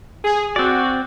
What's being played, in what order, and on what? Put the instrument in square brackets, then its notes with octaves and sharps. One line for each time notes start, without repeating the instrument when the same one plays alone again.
[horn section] G#4
[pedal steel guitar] C4 D5 [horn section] F#4